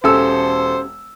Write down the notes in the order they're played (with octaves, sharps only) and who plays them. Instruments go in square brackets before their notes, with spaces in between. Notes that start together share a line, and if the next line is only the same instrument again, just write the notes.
[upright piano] E1 A4 E6 [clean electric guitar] C#4 G4 G#5 [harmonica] C5